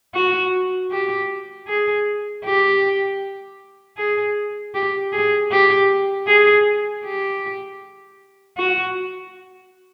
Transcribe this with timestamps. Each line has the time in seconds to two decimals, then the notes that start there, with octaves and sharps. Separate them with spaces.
0.14 F#4
0.91 G4
1.68 G#4
2.45 G4
3.97 G#4
4.74 G4
5.12 G#4
5.51 G4
6.27 G#4
7.04 G4
8.57 F#4